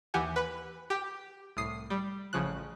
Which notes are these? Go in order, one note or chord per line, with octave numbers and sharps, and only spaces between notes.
D#2 E3 G4 F#5 G#5
B4 B5
G4 G5
C2 A2 D#6 C7
G3
A1 C#3 F3 F#6